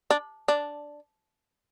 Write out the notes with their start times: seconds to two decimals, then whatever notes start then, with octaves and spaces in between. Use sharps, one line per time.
0.10 D4
0.48 D4